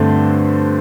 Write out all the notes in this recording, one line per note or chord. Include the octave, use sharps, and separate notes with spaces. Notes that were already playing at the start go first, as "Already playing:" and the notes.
Already playing: G2 D3 A3 C4